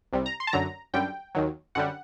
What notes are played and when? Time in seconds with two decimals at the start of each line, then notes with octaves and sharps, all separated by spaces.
0.13 C2 C3 G3
0.26 A#5
0.40 C6
0.47 A5
0.53 F#2 D3 F#3 A#5
0.94 F#2 D3 G3 G5
1.35 D#2 D#3 F#3
1.75 F#2 D3 G3 F#5